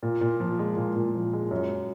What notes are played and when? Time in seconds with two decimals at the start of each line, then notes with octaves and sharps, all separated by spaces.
0.03 A#2
0.21 A#2
0.40 F3
0.59 G#3
0.77 A#2
0.96 A#2
1.14 F3
1.33 G#3
1.51 F#2